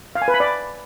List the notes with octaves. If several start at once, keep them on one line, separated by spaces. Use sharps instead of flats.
F5
G#5
B4
B5
D5